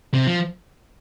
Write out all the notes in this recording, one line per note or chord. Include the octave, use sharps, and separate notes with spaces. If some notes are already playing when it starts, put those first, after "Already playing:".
C3
F3